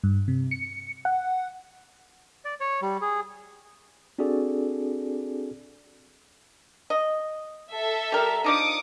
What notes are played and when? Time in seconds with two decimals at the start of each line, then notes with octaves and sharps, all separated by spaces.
0.04 G2
0.28 C3
0.51 C#7
1.05 F#5
2.45 D5
2.60 C#5
2.82 G3
3.02 G#4
4.19 C4 D4 F#4 G#4 A4 D5
6.90 D#5
7.70 A4 E5
8.12 G3 A#4
8.44 F3 D4 D#4 D6 D#6 C#7